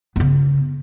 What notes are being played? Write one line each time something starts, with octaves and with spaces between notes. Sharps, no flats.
C#3 B3